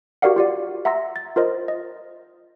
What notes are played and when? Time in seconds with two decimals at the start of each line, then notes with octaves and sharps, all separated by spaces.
0.22 F#4 G4 A#4 D5 F5 F#5
0.36 F4 G4 D5
0.85 E5 F#5 A#5 C6 E6 A#6
1.16 A6
1.36 F4 A#4 C5 D#5
1.68 D#5